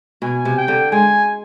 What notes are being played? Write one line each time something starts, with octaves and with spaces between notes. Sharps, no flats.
B2 G#5
C3
G5
D3
G#3 G#5